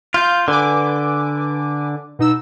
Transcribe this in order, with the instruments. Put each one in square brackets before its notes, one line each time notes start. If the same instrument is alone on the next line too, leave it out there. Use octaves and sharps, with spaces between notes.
[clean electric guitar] F4 [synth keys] F5 G6
[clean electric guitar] D3 [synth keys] B4 G#5 D6
[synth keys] B2 D#4 E6